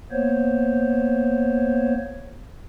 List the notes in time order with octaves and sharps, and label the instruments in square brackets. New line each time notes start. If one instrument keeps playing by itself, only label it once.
[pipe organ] A#3 B3 C5 C#5